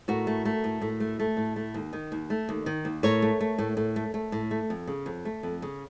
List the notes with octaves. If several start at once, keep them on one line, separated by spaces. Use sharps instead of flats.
A2 F#4 A#4
A3
A3
A2
A2
A3
A3
A2
A3
D#2
D#3
D#2
A3
D#2
D#3
D#2
A2 A#4 C#5
A3
A3
A2
A2
A3
A3
A2
A3
F2
C#3
F2
A3
F2
C#3